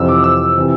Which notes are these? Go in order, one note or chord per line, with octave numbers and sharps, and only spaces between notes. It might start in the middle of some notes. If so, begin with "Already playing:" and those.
Already playing: F2 C3 E3 E6
D6
D6
E6
C3 E3